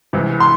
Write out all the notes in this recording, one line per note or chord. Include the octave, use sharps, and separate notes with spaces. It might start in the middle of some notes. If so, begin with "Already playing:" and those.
C#2 C3 E3
C6